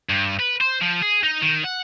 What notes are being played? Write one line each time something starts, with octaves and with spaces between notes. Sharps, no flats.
G2
B4
C5
F3
G#4
D#4
D#3
F#5